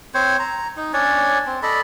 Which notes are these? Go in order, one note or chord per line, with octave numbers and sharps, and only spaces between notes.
C4 C5 C#5
A#5
D#4
C#4 D4 C#5 D5
C4
A4 D5 D#5 B5